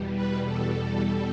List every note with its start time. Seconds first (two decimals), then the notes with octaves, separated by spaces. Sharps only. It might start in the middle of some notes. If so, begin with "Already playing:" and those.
Already playing: E2 B2 G3
0.14 B4
0.45 A4